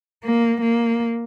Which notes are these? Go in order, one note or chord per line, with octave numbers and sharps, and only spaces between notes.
A#3
A#3